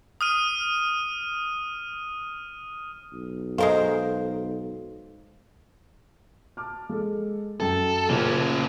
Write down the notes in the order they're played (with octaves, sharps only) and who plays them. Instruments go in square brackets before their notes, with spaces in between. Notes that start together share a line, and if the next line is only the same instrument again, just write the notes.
[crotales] D#6 F6 D#7
[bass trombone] B1
[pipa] G#3 A#4 C5 [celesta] A4 [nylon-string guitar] F5
[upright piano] A5 D6 F6
G#3 A4
[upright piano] F#2 G5 [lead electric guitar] A4
[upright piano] A#2 C#3 [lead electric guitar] A#3 C#4